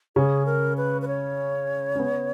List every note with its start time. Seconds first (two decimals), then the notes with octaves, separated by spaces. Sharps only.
0.16 C#3 C#4 G#4
0.46 A#4
0.77 B4
1.02 B4
1.08 C#5
1.95 C#4
1.99 B3